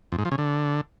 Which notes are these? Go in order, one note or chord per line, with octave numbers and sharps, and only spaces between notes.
F2
G#2
F3
C#3
D3